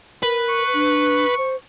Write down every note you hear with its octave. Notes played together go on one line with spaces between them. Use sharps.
A#4 B4
C#6
D4
C5